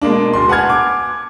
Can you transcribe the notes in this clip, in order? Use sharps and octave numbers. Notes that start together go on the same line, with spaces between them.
B2 G#3 A#3 D4
D1 C6
B4 F#5 G#5 A5 F6 G#6
D6